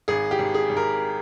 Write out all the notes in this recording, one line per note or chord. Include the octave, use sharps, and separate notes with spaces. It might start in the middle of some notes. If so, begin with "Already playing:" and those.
G#1 G#4
G4
G#1
G#4
G#1
A#4